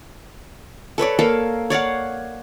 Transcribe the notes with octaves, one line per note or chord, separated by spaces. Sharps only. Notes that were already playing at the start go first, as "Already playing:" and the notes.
A4 B4 C#5 D5
A#3 A4 A#4 F5
C#5 D5 F5 F#5